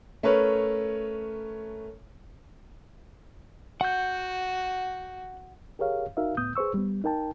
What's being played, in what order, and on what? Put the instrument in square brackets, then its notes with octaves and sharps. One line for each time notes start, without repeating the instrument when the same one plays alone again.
[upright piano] A3 C#4 A#4 B4 C#5
[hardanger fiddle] F#4 [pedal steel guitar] F#5 G6
[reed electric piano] G4 G#4 A#4 C#5 F5
D#4 F#4 A#4 E5 F5
C#2 A2 B3 D#6 G6
G#4 B4 C5 C#6 E6
G3 B3
D#4 A#4 G5 A5